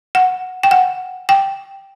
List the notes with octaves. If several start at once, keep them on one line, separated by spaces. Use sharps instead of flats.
F#5
G5
F#5
G5